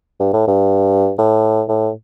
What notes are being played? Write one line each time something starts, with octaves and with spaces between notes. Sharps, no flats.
G2
A2
G2
A2
A2